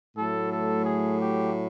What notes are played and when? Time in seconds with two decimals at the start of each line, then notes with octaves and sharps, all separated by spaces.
0.16 A2 F#3 A3 A4
0.51 A4
0.85 G#4
1.20 G4